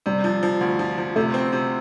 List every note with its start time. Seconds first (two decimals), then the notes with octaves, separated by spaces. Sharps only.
0.06 C3 G3
0.24 F3
0.43 F3
0.61 D2
0.79 F3
0.98 F3
1.16 C3 A3
1.34 C4
1.53 C3